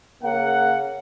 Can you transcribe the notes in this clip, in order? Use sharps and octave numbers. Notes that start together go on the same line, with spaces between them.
C#3 A#3 C#4 F#5